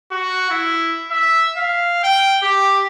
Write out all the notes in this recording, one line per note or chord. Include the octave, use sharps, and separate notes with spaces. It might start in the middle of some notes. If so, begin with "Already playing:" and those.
F#4
E4
E5
F5
G5
G4